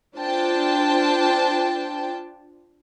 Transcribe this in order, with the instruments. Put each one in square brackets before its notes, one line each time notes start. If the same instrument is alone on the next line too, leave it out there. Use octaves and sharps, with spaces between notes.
[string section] D4 F4 C5 G5 A5